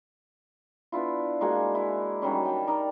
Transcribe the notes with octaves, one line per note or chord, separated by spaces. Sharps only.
B3 D4 E4 F4
G#3 A#3 F#4 G#5
E4
D#3 F#3 G3 C#4
G5 A5
D#4 A#4 D5